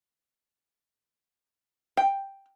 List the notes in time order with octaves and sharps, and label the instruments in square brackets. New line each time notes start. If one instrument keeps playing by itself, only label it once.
[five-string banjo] G5